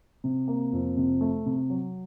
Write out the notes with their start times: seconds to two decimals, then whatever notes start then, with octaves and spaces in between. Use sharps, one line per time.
0.24 C3
0.48 A#3
0.73 F2
0.97 C3
1.21 A3
1.46 C3
1.70 F#3